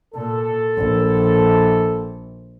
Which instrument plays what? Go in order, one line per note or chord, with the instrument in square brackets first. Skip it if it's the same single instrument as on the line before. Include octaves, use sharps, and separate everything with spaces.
[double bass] A#2 [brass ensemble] A4
[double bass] A#1